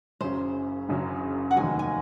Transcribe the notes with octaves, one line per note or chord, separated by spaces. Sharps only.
F#1 F#2 C#3 F#3 C#4 C5
F#1 F#2 C#3 F#3 C#4
F#5
F1 D#2 D#3 F#3 G#5
G#5